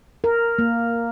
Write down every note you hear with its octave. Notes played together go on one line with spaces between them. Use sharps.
A#4
A#3